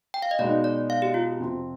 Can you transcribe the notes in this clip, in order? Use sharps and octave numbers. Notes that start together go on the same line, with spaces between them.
G5
F5
D#5
B2 G#3 B3 D#4 D5
D5
F5
G4
F4
F2 C3 F3 C4